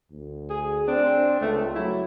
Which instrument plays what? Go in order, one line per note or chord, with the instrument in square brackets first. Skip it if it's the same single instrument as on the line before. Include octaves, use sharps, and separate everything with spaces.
[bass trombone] D2
[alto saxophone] G#4
[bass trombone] C4 [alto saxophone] D4
[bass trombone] C#2 [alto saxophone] A3
[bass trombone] F#3 [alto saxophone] E4